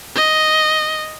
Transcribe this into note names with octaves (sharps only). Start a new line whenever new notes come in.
D#5